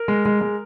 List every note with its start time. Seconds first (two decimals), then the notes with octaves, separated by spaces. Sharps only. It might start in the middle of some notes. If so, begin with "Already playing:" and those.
Already playing: A#4
0.08 G#3
0.25 G#3
0.41 G#3